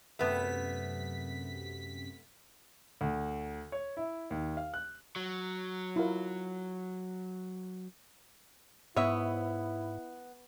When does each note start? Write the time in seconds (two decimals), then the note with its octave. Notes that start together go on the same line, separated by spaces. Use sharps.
0.19 F#2 C3 A3 B3 B6
3.01 D2
3.72 C#5
3.97 E4
4.31 D#2
4.57 F5
4.74 F#6
5.16 F#3
5.96 E4 F4 A#4
8.96 G#2 B3 E4 C#5 E5